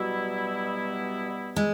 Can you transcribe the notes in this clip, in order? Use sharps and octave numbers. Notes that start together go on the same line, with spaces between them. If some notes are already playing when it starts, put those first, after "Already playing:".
Already playing: B2 F#3 G3 B3 E4
G#3